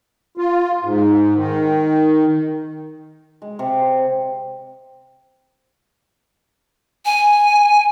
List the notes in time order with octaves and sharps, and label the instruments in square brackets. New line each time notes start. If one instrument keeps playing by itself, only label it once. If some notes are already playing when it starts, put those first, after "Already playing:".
[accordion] F4
G#2
D#3
[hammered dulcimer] G#3
C3
[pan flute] G#5